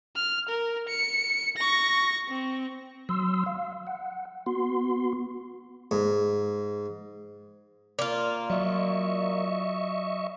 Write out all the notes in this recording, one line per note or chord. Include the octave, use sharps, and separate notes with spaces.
F6
A#4
C#7
C#6 A#6
C4
F#3 C6 E6
F5
F#5
B3 F#4 C6
G#2
A#3 F4 D5
F#3 D#5 E5 C#6